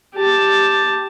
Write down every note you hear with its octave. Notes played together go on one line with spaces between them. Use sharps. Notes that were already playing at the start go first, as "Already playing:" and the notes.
G4 A5